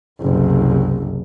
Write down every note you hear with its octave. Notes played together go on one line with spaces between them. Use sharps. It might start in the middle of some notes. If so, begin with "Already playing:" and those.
F#1 C2